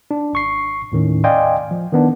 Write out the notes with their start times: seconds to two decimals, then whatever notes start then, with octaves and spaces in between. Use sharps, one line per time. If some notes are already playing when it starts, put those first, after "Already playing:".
0.11 D4
0.33 G#1 C#6 C7
0.92 D#2 A2 D#3 C#4
1.24 D5 D#5 F5 G5 G#5 C6
1.71 F3
1.92 D#3 B3 D4